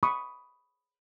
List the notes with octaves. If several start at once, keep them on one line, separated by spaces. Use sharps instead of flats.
B5 C#6 D#6